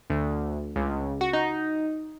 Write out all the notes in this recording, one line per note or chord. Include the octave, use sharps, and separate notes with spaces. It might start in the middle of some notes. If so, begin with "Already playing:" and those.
D2
C#2
F#4
D#4